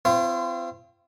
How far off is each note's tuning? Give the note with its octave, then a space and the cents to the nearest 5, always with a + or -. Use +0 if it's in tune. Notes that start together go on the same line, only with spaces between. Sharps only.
C4 -30 F4 -40 C5 +35